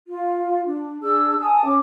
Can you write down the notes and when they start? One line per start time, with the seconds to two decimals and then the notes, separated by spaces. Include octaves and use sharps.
0.08 F4
0.66 D4
1.02 D4 G#4 E6
1.40 G#5 A5 D#6
1.65 C#4 D6